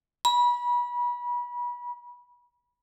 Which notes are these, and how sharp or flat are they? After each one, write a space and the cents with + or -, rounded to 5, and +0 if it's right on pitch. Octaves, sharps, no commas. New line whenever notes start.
B5 -30